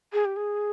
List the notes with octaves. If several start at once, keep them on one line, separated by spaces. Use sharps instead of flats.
G#4
G4
G#4